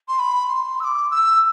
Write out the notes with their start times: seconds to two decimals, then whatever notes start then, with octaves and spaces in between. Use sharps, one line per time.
0.08 C6
0.19 B5
0.49 C6
0.80 E6
0.84 D6
1.11 E6